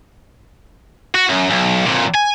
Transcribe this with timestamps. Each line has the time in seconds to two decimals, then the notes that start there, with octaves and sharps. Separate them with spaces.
1.15 F#4
1.29 F#2
1.50 B1
1.86 F2 A#2
2.15 G#5